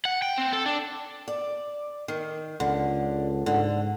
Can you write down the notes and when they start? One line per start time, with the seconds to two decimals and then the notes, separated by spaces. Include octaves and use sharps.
0.05 F#5
0.22 G5
0.38 C4
0.53 A4
0.66 D4
1.28 D5
2.08 D#3
2.60 C#2 D3
3.46 G#2 D3